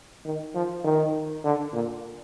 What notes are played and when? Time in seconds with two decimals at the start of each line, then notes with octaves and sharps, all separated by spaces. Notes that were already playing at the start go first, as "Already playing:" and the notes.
0.25 D#3
0.55 F3
0.84 D#3
1.44 D3
1.73 A#2